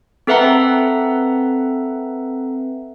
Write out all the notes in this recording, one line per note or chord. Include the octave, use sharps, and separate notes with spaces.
C4 A4 B4 E5 F#5 A#5